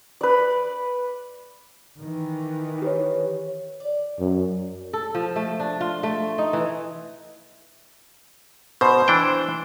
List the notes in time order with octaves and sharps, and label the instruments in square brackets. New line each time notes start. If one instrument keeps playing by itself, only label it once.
[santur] B4 D5
[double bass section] D#3 E3
[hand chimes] G4 B4 C#5
[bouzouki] D5
[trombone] F#2
[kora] A4
F3
A3
D4
F4
A3
D#4
E3
[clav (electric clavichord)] B2 [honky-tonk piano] C5
[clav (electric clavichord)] E3 D4 G5